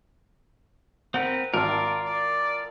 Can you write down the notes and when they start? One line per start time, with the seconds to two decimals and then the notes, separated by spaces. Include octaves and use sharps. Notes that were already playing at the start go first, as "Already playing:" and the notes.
1.14 C4 A#4 B4 F#5
1.54 G#1 F4 A#4 D5 A5 F6
2.05 D5